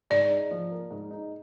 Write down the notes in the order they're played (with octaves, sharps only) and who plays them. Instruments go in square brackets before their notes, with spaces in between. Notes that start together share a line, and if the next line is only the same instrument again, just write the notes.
[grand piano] G#2 [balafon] D5
[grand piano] D#4
F3
A#3
G#2
D#4